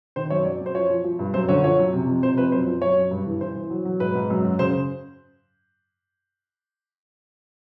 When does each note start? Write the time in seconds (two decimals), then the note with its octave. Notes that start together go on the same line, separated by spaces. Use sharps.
0.16 D#3 C5
0.30 F#2 C#5
0.45 F#3 D5
0.61 F#2
0.66 C5
0.75 F3 C#5
0.90 F3
1.04 F3
1.19 G2
1.34 F#2 C5
1.49 D3 C#5
1.64 F3 C#5
1.79 F#2
1.93 C3
2.07 F2
2.23 C3 C5
2.38 F2 B4
2.52 F#2 C5
2.67 F3
2.82 F#2 C#5
2.97 F#2
3.11 G2
3.26 E3
3.41 E3 C5
3.55 E3
3.70 F#3
3.85 F#3
4.00 G#2 B4
4.15 G#2
4.30 F#2
4.45 F#3
4.59 C#3 C5